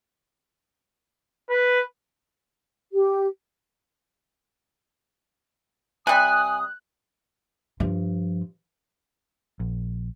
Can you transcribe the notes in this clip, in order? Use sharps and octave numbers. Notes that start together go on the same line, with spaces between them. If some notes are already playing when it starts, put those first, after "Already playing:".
B4
G4
C3 G3 G#5 D#6 F#6
G2 F3
A#1